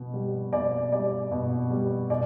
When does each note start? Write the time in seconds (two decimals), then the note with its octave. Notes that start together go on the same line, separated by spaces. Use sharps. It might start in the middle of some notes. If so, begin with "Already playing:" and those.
Already playing: B2
0.14 G3
0.53 B2 D5
0.92 G3 D5
1.31 B2
1.70 G3
2.10 B2 D5